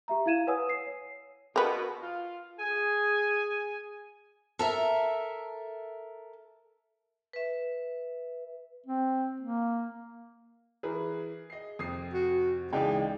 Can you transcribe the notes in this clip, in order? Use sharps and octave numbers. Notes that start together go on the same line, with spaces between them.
G4 E5 A#5
E4 F5 G#6 D#7 E7
B4 C#5 F#5 G#5 D#6 E6
C7
C#5
B2 A#4 B4
F4
G#4 G#5
A4 A#4 E5
B4 E5
C4
A#3
E3 G#4 A#4 B4
D#5 C7
F2 C3 D#6 C7
F#4
C#2 E3 G#3 D#4 G#4 D5 G5